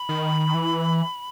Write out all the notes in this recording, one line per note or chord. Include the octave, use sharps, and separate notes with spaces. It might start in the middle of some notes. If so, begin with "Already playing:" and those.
Already playing: B5
D#3
E3